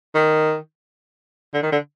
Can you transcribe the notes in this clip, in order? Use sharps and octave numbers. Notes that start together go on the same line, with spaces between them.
D#3
D3
D#3
D3